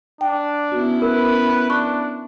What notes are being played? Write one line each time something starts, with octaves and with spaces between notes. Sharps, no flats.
D4 G5
B3 C#4 E4 F#4
A#4 B4
D4 C#6 F#6